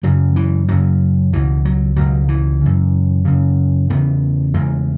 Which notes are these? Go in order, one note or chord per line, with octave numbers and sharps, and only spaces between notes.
F#2 C#3 F#3
E3
F#2 C#3 F#3
C#2 B2 E3
F#3
C#2 B2 F#3
E3
F#2 C#3
F#2 C#3
E2 C#3 B3
E2 C#3 G#3